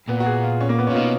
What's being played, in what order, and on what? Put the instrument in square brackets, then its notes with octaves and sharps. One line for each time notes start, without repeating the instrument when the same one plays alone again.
[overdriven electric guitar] A#2 [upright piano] B3
[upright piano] F#4
G#4
F4
C#4
A#3
B3
[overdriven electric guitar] A#2 [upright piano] C#4 F4
[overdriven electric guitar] B2 [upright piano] D#4